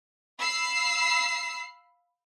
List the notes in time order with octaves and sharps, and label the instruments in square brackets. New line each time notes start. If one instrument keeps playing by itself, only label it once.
[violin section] F5 B5 E6 C7